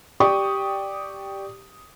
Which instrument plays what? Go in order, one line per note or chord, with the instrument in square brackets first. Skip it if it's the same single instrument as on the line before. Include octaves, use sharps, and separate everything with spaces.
[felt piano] G4 D5 G5 C#6 D#6